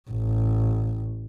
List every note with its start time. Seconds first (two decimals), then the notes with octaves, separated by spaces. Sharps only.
0.10 A1